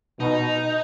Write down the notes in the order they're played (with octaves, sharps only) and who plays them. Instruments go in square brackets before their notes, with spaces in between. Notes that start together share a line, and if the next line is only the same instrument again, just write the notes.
[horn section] B2 [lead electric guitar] D#4